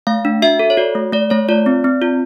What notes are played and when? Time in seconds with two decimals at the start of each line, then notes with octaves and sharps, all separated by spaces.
0.07 A3 F5
0.25 D4
0.42 F#4 E5
0.59 A4
0.70 C#5
0.77 F#4 D5
0.95 A3
1.12 A3 D5
1.30 A3 C#5
1.49 F4 D5
1.66 C4
1.84 C4
2.02 F4